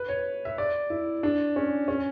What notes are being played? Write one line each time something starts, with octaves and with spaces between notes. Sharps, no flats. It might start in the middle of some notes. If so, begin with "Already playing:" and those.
Already playing: B4
C#5
E5
D5
E4
D4
C#4
C#4